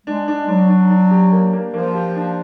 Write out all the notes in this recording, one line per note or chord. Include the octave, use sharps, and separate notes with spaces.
G#3 D4
D4
F#3 D4
D4
D4
G4
A#3
A#3
F3 A#3
G4
D4